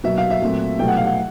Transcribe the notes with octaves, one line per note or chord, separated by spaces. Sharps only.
B2 F#3 A#3 E5
F5
E5
A#2 F#3 A3 C4
C2 B2 F#3 A3 G5
F#5
F5
F#5